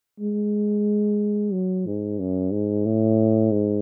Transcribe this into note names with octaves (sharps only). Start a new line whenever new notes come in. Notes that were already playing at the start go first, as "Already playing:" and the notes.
G#3
F#3
G#2
F#2
G#2
A2
G#2